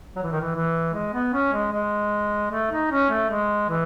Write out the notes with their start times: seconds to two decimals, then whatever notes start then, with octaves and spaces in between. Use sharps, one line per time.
0.16 F#3
0.23 E3
0.32 D#3
0.40 E3
0.55 E3
0.94 G#3
1.13 B3
1.33 C#4
1.53 G#3
1.72 G#3
2.51 A3
2.70 D#4
2.91 C#4
3.10 A3
3.29 G#3
3.69 E3